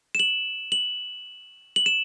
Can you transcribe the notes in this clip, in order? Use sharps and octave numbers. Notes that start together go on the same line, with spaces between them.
E7
F#7
F#7
F#7
E7